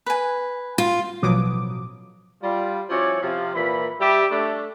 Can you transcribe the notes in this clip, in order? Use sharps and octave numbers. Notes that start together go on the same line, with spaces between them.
B4 G#5
F4
A1 B2 F3 F#3 D6 D#6
G3 F4
F3 C#4 E4 F#4 C#5 D5
C3 F3 F4
A#2 E3 B5
G3 G4 E5
A3 D4